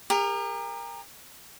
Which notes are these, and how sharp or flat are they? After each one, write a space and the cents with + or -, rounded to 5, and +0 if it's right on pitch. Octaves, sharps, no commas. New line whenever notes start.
G4 +45 A#4 -5